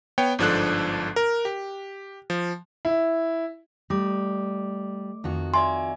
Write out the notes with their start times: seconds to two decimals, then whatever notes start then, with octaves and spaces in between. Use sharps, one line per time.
0.18 B3 C#5 G5
0.39 G1 G#2 F3 D4 A4 F#6
1.16 A#4
1.45 G4
2.30 F3
2.85 E4
3.90 G3 A3 D6
5.24 F2 D#3 F#4
5.54 D5 E5 G#5 C6